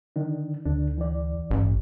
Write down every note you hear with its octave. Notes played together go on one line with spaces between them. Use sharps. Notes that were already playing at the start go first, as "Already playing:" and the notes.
D3 D#3 D4
D2 D3 D4
E3 D5
A1 G2